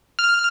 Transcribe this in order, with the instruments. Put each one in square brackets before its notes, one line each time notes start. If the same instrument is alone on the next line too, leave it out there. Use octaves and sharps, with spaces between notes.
[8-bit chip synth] F6